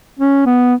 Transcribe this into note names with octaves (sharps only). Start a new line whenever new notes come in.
C#4
B3